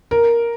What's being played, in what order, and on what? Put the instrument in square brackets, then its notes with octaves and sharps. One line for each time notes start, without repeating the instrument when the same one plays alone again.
[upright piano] A#4